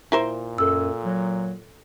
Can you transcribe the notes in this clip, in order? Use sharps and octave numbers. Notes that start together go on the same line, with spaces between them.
A#2 E4 A#4 C5
F#2 A4 E6
F#3